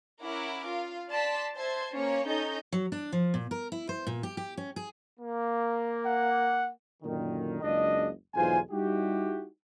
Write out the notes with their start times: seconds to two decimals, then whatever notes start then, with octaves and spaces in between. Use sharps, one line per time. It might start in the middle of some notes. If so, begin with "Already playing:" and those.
0.22 C#4 E4 A#4 F#5 D6
0.67 F4 F5
1.09 D5 A5 C6 B6
1.56 C5 E5 A5 C6 G#6
1.92 A#3 C#4 C#5
2.26 C#4 D#4 A4 D#5 G6
2.72 F#3
2.92 D4
3.12 F3
3.34 A#2
3.51 A#4
3.72 E4
3.89 C5
4.07 A#2
4.23 G4
4.37 G4
4.57 C#4
4.76 G#4
5.19 A#3
6.06 F#5
7.03 F#2 A#2 D3 D#3
7.62 F#1 C#2 C#3 D4 D#5
8.34 B1 E2 G#2 F4 C5 G#5
8.70 G3 D#4 E4 F#4 G4